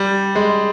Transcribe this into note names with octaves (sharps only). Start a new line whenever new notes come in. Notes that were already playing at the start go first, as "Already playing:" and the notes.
Already playing: G3
G#3